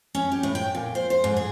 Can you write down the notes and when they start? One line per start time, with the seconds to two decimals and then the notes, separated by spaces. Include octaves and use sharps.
0.15 C#4
0.32 G4
0.43 A2
0.55 G5
0.75 A#2
0.95 C5
1.10 C5
1.24 G#2
1.37 G#4